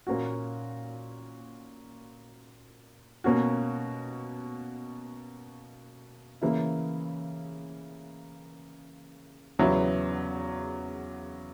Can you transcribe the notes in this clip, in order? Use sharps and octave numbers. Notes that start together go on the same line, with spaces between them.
A#2 A#3 C#4 F#4
B2 A#3 C#4 F#4
C#3 E3 A#3 E4
E2 C#3 F#3 B3 E4